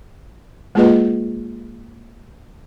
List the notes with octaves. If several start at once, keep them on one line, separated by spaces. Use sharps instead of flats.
G#3 A#3 F4 G#4 B4 D#5